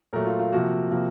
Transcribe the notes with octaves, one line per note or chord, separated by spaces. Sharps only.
A#2 F#3 A3 A#4
F4
F4
C3 F3 A#3 F#4
C3 F3 A#3